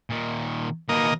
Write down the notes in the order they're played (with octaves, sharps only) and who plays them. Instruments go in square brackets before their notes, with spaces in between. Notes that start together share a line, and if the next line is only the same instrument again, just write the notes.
[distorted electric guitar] A#2 D#3
[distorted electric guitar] D#2 B2 [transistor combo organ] A#3 D#5